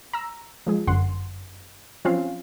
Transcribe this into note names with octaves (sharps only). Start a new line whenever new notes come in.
A#5 E6
F3 G#3 G#4
G1 F#2 F#5 C6
F3 F#3 C4 C#4 F4 F5